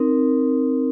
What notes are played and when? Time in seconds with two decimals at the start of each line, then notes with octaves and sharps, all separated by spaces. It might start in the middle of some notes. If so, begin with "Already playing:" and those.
Already playing: C4 D#4 A#4